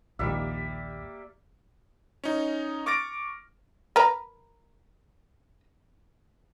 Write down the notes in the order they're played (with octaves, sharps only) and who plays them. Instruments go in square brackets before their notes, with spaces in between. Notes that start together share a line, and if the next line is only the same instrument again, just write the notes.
[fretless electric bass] A#1 D#2 G#2 [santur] G3 A#3 E5
[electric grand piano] C#4 D#4
C#6 D6 F6 A6 A#6 D7
[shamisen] A#4 B4 A#5